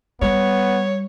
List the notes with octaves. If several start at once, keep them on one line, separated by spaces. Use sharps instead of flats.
G3 B3 C#5